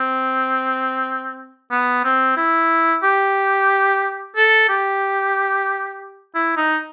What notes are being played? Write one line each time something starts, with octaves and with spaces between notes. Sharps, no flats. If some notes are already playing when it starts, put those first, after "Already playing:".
Already playing: C4
B3
C4
E4
G4
A4
G4
E4
D#4